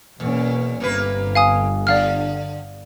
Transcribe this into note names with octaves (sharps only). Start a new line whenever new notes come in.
E2 B2 A#3 C#4
G1 C3 A#3 B4
F5 G#5 D#6
D3 D5 F5 F6